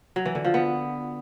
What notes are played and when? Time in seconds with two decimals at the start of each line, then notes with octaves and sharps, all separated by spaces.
0.16 F#3
0.25 E3
0.35 D3
0.44 F3
0.54 B3